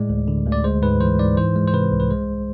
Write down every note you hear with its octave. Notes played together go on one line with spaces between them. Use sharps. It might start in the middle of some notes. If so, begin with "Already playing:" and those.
Already playing: A2 G#3 D5
D2
D3
D2
D5
G#3 C5
G#2 B4
E3 C5
G#2 D5
E3 C5
G#3
C5
C3 B4
C2
B4
G#3 C5